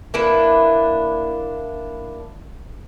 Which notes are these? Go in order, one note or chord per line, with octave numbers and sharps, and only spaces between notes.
A#3 D4 E4 B4